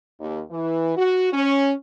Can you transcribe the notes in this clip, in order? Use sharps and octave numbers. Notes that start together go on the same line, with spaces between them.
D#2
E3
F#4
C#4